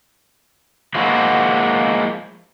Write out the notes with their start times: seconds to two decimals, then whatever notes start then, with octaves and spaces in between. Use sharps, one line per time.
0.95 F3 G#3 A#3 E4 F#4